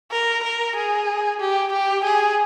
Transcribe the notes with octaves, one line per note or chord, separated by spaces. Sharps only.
A#4
A#4
G#4
G4
G4
G#4